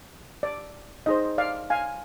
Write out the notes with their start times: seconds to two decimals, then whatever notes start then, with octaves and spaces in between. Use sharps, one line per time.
0.43 D5
1.06 D#4 G#4 C5 D#5
1.38 D5 F5
1.70 F5 G#5